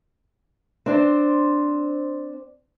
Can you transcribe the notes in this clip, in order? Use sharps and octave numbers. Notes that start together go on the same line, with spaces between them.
C4 D4 C5